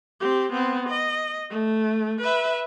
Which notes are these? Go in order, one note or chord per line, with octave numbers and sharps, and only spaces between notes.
C4 G4
B3 C4
D#5
A3
B4 E5